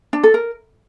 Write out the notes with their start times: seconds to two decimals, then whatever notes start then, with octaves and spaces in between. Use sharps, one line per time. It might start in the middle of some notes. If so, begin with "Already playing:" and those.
0.13 D4
0.23 A4
0.34 A#4